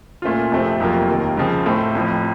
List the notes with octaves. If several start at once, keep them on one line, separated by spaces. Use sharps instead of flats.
A#2 A3 C#4 F4
F2 C3 F3 A3 C4
F2 C3 F#3 A#3 F4
D#2 D#3 A#3 D#4
C#2 C#3 F3 C4
A2 A3 C4
A1 A2 F3